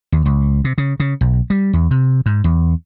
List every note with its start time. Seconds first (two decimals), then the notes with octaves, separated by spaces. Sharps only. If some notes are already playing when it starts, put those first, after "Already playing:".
0.12 D#2
0.26 C#2
0.64 C3
0.78 C#3
1.00 C#3
1.21 B1
1.50 G3
1.73 E2
1.91 C3
2.26 G#2
2.44 E2